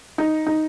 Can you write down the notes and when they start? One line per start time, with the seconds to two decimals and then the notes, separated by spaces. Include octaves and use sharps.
0.18 D#4
0.47 D#4